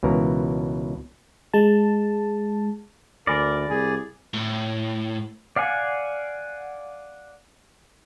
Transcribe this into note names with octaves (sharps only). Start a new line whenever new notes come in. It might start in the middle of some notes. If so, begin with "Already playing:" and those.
C#2 B2 E3 A#4
G#3 A5
D2 A#4 D5 G#5 B5 A#6
C2 G#4
A2
D5 F5 F#5 G#5